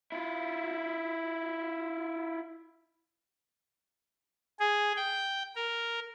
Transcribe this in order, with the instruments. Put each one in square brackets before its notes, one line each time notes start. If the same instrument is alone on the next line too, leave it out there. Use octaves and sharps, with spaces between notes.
[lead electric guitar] E4 F4
[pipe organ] G#4
G5
A#4